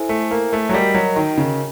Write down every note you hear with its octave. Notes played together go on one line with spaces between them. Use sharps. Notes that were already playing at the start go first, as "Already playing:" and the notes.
Already playing: E4 A4 C5 E5 G#5
A3
A#3
A3
F#3
G3 F#4 A#4 D#5 G5
F#3
D#3
C#3